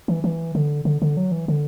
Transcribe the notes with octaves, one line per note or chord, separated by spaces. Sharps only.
E3
E3
D3
D3
D3
F#3
E3
D3